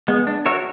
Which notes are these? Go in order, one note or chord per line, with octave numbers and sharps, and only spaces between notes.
G#3 B3
D4
F#4 A#4 C#5 E5